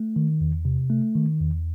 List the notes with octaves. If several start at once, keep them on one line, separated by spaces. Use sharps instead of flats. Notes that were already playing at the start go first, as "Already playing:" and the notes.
Already playing: A3
D#3
E2
C3
A3
D#3
E2